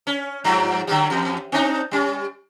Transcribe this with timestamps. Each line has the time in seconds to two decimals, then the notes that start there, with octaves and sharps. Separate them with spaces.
0.07 C#4
0.44 G2 F3 F#3
0.87 D3 F#3 G3
1.10 E2
1.52 C4 D4 D#4
1.91 G3 C#4